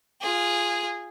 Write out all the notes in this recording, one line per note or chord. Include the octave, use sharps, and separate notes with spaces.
F4 G#4